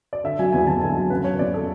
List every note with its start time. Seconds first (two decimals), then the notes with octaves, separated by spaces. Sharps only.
0.13 D5
0.24 D3 E5
0.39 F#3 G#5
0.52 E2 G#5
0.67 E2 A5
0.82 D3 G#5
0.96 F#3 G#5
1.10 C#3 B4
1.24 F#3 C#5
1.39 E2 D5
1.54 A4